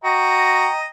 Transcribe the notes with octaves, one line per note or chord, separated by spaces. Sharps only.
F#4 D#5 G5 A#5